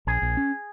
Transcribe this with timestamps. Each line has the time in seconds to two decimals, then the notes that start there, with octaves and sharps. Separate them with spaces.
0.07 A#1 G#4
0.22 A#1
0.37 C#4